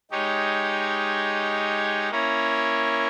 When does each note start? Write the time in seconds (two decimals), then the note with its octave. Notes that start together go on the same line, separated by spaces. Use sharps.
0.11 G#3 D#4 G4 C#5
2.10 A#3 C#4 E4 A#4 C#5